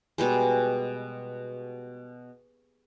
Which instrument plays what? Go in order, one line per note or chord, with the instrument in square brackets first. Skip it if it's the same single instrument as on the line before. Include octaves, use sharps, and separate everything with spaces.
[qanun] B2 G3 G#3